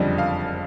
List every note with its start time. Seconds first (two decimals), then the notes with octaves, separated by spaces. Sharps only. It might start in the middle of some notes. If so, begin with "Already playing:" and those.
Already playing: F#1 F2 D3 G3 D#5
0.18 F5